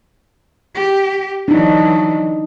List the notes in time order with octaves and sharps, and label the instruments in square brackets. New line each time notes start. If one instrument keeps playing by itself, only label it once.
[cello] G4
[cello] E3 F#3 [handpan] D4 D#4